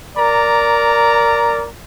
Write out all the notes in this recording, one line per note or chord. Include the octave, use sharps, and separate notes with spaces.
A#4 D5 A#5